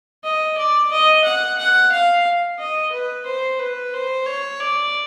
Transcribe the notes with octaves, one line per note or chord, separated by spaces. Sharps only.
D#5
D5
D#5
F#5
F#5
F5
D#5
B4
C5
B4
C5
C#5
D5